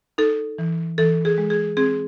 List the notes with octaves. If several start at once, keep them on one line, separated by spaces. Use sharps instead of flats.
D#4 A4
E3
E3 A4
G#4
G#3
G#4
C4 G#4